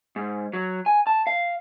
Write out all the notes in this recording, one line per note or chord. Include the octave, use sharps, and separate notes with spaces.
G#2
F#3
G#5
A5
F5